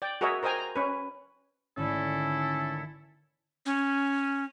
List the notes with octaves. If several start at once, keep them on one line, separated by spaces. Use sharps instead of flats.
D5 G5
F#4 G#4 A#4 C#5 D#5 E5
A#4 C5 D#5 G5 G#5 A#5
A#5
C#4 B4
G#1 D3 A3 C#4 E4 A4
C#4